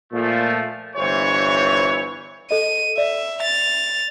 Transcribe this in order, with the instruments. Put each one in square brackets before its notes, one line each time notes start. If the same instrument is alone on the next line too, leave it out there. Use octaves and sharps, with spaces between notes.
[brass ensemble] A#2 F3 A3
G1 E3 C5 C#5
[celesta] A4 D#5 [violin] D#7
[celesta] D5 [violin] E5
[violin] A6 F7